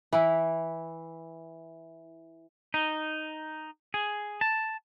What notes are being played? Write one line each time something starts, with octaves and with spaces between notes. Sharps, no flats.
E3 E4
D#4
G#4
A5